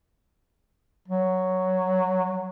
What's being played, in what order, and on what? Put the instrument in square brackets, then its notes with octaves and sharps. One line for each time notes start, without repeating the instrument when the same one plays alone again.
[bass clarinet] F#3